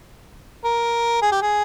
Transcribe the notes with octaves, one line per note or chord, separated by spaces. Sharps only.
A#4
G#4
G4
G#4